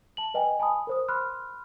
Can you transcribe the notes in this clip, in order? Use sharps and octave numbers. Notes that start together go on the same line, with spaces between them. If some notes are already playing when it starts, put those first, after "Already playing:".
A5 F#7
B4 D#5 G5 G#5
G#5 A5 B5 D#6
A#4 C5 D#6
B5 C6 F6 F#6